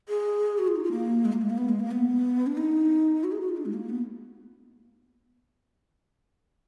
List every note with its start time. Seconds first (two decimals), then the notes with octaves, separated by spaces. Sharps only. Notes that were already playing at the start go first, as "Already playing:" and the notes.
0.09 G#4
0.59 F#4
0.67 F4
0.76 D#4
0.84 F4
0.92 A#3
1.25 G#3
1.33 A#3
1.42 G#3
1.50 A#3
1.58 B3
1.69 G#3
1.80 A#3
1.91 B3
2.47 D4
2.57 D#4
3.24 F#4
3.32 G#4
3.41 F#4
3.49 F4
3.57 D4
3.65 G#3
3.74 A#3
3.89 B3